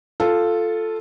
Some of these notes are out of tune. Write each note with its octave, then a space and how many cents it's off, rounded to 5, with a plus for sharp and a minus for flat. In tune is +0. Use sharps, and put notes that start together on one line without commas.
F4 +0 A4 +0